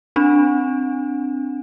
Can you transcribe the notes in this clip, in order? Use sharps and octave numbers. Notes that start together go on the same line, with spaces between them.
C4 D4